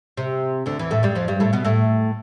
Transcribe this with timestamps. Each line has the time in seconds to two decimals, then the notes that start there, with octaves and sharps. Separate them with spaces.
0.17 C3
0.66 D2 D3
0.79 E2 E3
0.91 A2 A3
1.03 G2 G3
1.15 F2 F3
1.28 G2 G3
1.40 A2 A3
1.53 B2 B3
1.65 A2 A3